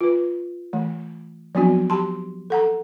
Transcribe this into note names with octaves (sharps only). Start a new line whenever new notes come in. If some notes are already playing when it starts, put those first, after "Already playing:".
F4 B4
E3 A3
F3 F#3 B3 C4 D4 F#4
G4 A5 C6
A4 F#5 A#5